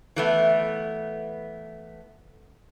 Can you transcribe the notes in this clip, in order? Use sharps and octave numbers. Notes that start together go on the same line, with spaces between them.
E3 A3 B3